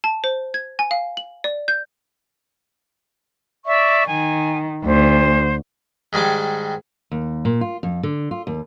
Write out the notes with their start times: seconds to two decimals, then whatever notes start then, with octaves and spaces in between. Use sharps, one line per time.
0.04 A5
0.24 C5
0.54 G#6
0.79 G#5
0.91 F5
1.17 F#7
1.44 D5
1.68 G6
3.65 D5 E5 C#6
4.07 D#3 G#5
4.84 D2 C5
6.13 G#2 D#3 G3 G#5 D6
7.11 D#2
7.45 A#2
7.61 F4
7.83 F2
8.03 D3
8.31 F4
8.47 D#2